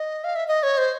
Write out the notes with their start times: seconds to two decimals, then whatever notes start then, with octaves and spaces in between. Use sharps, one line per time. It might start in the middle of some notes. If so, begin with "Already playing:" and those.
Already playing: D#5
0.24 F5
0.36 E5
0.48 D#5
0.63 C#5
0.78 C5